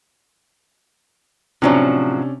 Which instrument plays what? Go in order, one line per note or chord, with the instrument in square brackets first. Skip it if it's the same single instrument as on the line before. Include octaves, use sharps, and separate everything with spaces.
[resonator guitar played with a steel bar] A2 F3 F#3 [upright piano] C3 C#4 D4